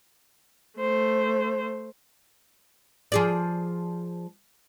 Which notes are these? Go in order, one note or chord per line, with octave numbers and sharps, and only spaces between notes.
A3 C5
F3 G#4 D5